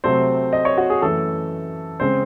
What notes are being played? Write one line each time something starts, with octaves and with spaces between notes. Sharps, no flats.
C3 F#3 A3 C4 C5
D#5
C#5
F#4
G#4
F#2 E3 A3 A4
C#3 G#3 C4 C5